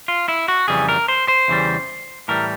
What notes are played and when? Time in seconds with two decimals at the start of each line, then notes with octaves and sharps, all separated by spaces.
0.08 F4
0.28 E4
0.48 F#4
0.68 F2 C#3 E3 G3 G#4
0.89 A#4
1.08 C5
1.28 C5
1.48 E2 C#3 E3 G3
2.28 A2 E3 G3 A#4